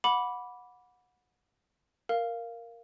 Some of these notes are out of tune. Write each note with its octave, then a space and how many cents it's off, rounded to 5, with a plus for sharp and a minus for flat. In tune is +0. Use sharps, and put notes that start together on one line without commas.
F#5 -25 B5 -10 D6 -10
A#4 +0 F5 -5